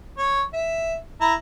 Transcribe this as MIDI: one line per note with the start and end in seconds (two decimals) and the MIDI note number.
0.18 0.42 73
0.53 0.96 76
1.21 1.34 64
1.21 1.34 82